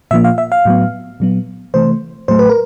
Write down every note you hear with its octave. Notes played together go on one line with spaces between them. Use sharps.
A#2 F3 A#3 E5
F5
E5
F5
A2 F#3 B3
A#2 F#3 B3
C3 E3 A3 C5
A2 F#3 A3 C5
B4
A#4